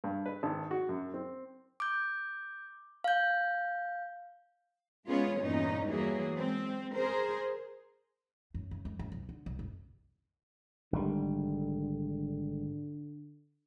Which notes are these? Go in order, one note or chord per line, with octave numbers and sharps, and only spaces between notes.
G2
B4
G#1
F#4
F#2
C4
D6 G6
F5 G6
G#3 B3 C#4 F4 G#4 C#5
E2 G2 A#2 C#4 D#4
E3 F#3 G3 A#3 G#4
G#3 C4
G#4 A#4 C5
F#2
C#3
F#2
F#2
C2
D3
C2
F#1
G#1 D3 G3